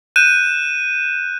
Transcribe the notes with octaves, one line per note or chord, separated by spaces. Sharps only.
F#6 G6 D#7 E7